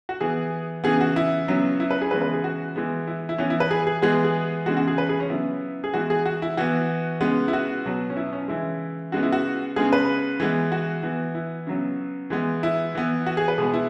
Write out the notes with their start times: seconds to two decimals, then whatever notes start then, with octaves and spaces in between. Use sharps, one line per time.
0.09 F#4
0.21 E3 B3 G#4
0.84 C#3 E3 B3 G#4
1.01 F#4
1.16 E4
1.48 C#3 F#3 B3
1.80 E4
1.91 B4
2.01 G#4
2.11 C#3 E3 G#3 B3 B4
2.22 B4
2.33 G#4
2.44 F#4
2.76 E3 G#3 B3
3.07 E4
3.29 E4
3.38 E3 B3 C#4
3.50 E4
3.60 B4
3.71 G#4
3.87 G#4
4.02 E3 G#3 B3 G#4
4.24 G#4
4.66 C#3 E3 G#3 B3 F#4
4.77 F#4
4.87 G#4
4.98 B4
5.09 G#4
5.20 C#4
5.30 C#3 F#3 B3 E4
5.84 G#4
5.94 E3 G#3 B3 F#4
6.10 G#4
6.26 F#4
6.42 E4
6.57 E3 B3 F#4
7.21 C#3 G#3 B3
7.48 E4
7.53 F#4
7.85 B2 F#3 B3
8.10 C#4
8.17 E4
8.33 C#4
8.48 C#3 E3 G#3 E4
9.12 C#3 G#3 B3 F#4
9.23 E4
9.32 F#4
9.76 C#3 G#3 B3 G#4
9.93 B4
10.40 E3 G#3 B3
10.72 F#4
11.03 E3 B3
11.35 E4
11.67 C#3 F#3 B3
12.30 E3 G#3 B3
12.63 E4
12.95 E3 B3
13.26 F#4
13.37 G#4
13.48 B4
13.58 B2 G#3 B3 G#4
13.74 E4